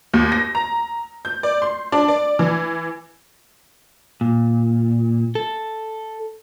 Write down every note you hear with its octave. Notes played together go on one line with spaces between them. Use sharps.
D#2
A#6
A#5
G6
D5
C6
D4
D5
E3
A#2
A4